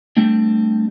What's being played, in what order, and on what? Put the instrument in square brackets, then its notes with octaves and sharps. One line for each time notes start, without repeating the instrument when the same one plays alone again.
[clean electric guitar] G3 A3 C4 D4